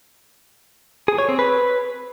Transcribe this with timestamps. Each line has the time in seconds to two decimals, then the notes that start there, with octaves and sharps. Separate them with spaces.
1.08 G#4
1.18 C#5
1.29 C4
1.39 B4